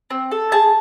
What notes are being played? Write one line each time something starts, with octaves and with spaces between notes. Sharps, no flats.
C4
A4
G#4 A5